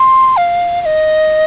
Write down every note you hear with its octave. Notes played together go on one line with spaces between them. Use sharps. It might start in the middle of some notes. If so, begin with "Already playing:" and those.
Already playing: C6
F5
F5
D#5